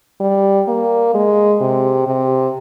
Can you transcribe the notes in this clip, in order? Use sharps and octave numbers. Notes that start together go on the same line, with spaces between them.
G3
A#3
G#3
C3
C3